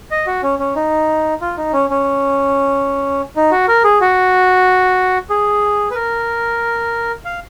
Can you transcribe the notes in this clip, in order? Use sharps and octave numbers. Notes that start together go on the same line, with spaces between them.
D#5
F#4
C#4
C#4
D#4
F4
D#4
C#4
C#4
D#4
F#4
A#4
G#4
F#4
G#4
B4
A#4
F5